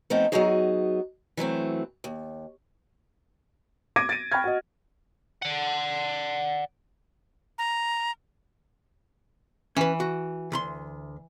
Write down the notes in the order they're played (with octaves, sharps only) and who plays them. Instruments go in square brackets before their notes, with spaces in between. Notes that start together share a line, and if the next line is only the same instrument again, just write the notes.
[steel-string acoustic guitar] F3 A3 B3 C4 D#4
F#3 G#3 B3 D#4 F#4 G#4
E3 F#3 A3 C4
D#2
[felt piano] D6 G#6 A#6 D7 D#7
A6 D7 D#7
G5 B5 C#6 F6 G#6
F#4 D#5
[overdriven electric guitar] D5 F#5
[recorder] A#5
[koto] E3 [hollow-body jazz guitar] C#4 B4
[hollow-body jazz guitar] F#4
D2 B5 C6